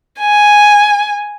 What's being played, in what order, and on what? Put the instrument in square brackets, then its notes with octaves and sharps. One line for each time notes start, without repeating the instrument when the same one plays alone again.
[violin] G#5